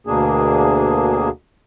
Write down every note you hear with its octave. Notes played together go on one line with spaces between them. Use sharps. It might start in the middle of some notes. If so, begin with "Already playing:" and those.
D2 B2 A#3 D4 G#4